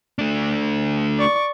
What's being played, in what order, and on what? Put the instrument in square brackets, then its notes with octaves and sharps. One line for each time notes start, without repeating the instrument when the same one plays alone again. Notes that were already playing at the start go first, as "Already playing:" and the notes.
[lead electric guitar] A3 D4
[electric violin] D5 C#6